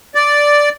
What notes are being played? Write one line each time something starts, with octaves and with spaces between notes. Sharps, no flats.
D5